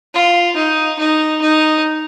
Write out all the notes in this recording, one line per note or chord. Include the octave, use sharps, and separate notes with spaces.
F4
D#4
D#4
D#4